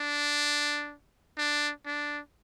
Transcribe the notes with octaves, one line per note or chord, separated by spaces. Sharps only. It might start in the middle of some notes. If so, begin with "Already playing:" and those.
Already playing: D4
D4
D4